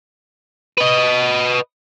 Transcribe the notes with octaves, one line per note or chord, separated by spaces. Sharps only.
B4 D#5